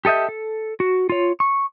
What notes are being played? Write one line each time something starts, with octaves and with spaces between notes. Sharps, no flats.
G4 A4 D#5 E5 G6
A4
F#4
F4 C#5
C#6